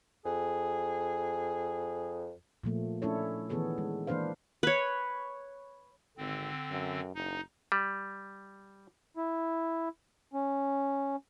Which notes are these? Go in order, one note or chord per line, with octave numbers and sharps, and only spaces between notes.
F2 G#4
A#2 F3 A3 A#3
A3 C#4 D4 E4 A4 C#5
D#3 E3 B3 G#4 A4 C#5
G#3
E3 A#3 D4 B4 C5 F5
B4 C#5
G#1 D3 C4
F#2
F#1 D#4
G3
E4
C#4